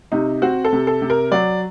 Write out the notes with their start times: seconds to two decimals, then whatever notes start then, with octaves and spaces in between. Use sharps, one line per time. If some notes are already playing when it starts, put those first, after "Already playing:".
0.12 C3 D#4
0.42 C4 F#4
0.65 A4
0.73 C3
0.87 A4
1.02 C3
1.10 A#4
1.31 F#3 D5